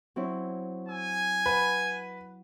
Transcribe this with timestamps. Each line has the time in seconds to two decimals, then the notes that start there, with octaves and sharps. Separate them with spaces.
0.16 F#3 C4 E4
0.89 G#5 E6
1.46 B4 F#5 B5